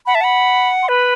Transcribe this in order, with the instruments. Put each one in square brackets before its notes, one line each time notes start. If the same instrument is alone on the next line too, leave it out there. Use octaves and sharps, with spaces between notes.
[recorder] F#5 [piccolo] B5
[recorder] E5 [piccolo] A5
[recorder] F#5 [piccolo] B5
[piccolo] C6
[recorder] B4 [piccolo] B5